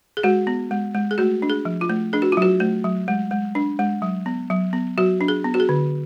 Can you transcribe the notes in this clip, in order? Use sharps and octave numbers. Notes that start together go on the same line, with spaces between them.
G#4
G#3 F#4
B3
G#3
G#3
G#4
A3 F#4
D4
G#4
F3
F4
A3
D4 G#4
F#4
F4
F#3 F#4
A3
F#3
G#3
G#3
D4
G#3
F#3
B3
F#3
B3
F#3 F#4
D4
G#4
B3
F#4
G#4
D3